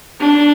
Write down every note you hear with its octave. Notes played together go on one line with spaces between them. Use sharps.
D4